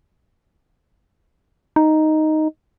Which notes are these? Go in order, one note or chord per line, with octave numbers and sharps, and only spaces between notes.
D#4